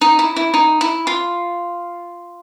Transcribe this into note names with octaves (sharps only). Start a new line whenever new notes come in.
D#4
E4
E4
D#4
E4
F4